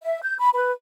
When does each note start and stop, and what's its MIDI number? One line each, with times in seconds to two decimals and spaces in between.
0.02 0.20 76
0.23 0.36 91
0.39 0.49 83
0.54 0.71 71